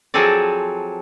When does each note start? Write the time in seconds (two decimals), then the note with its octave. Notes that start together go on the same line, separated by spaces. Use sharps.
0.14 F3 F#3 C4 G#4 A4 D5